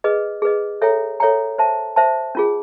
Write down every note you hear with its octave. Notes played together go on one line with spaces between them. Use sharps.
G#4 B4 D#5
G#4 B4 D#5
A4 C#5 E5 G5 A#5
A4 C#5 E5 G5 A#5
C5 E5 A5
C5 E5 A5
C#4 F4 G#4